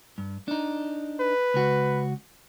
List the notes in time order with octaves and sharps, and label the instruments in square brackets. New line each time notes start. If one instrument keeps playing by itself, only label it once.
[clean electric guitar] G2
D4 D#4
[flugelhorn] B4
[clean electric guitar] C#2 F#4